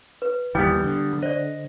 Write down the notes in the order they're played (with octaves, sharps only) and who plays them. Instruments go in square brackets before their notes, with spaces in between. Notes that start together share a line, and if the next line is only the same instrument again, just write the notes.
[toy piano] B4
[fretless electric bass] D#2 E3 [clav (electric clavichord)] G3 B3 G4 [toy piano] G5
[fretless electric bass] D3
[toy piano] C5 D5 [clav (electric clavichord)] D#5